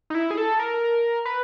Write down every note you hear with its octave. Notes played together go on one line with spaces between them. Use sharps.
D#4
E4
G#4
A4
A#4
B4